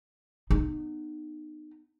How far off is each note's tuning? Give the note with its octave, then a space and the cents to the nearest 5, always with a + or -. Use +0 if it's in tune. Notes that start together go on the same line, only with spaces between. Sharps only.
B3 +0 D#4 -35